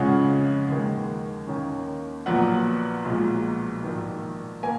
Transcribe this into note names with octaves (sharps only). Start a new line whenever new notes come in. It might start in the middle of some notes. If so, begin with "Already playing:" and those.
Already playing: F2 C#3 F3 G#3 C#4 F#5
D#2 D#3 G#3
D#2 D#3 A#3 C#4
A#1 A#2 F#3 B3 F#5
B1 A#2 F3 G#3
A#1 G#2 D#3
A#3 G#5